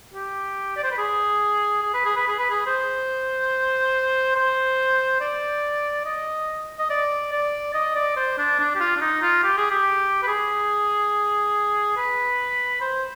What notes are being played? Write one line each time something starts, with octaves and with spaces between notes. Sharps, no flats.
G4
D5
C5
B4
G#4
G#4
B4
G#4
B4
G#4
B4
G#4
C5
C5
D5
D#5
D#5
D5
D5
D#5
D5
C5
D4
D4
G4
F4
D4
D#4
F4
G4
G#4
G4
B4
G#4
B4
C5